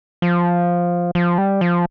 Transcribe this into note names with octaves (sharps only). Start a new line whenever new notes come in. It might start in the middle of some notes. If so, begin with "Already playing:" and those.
F3
F3
G3
F3